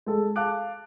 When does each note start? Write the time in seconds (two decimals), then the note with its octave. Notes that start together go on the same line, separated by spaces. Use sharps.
0.06 G#3 A4
0.36 F5 A5 D6 F#6 D7